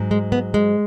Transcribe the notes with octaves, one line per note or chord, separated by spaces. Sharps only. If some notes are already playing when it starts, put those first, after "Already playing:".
Already playing: G#2 F#3
G#3
B3
G#3